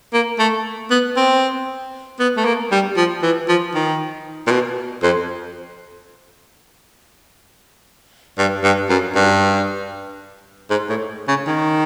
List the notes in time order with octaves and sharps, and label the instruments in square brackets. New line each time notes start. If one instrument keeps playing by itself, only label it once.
[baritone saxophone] A#3
A3
B3
C4
B3
A3
A#3
G3
F3
E3
F3
D#3
A#2
B2
F2
G2
G2
F#2
G2
G#2
A2
C#3
D#3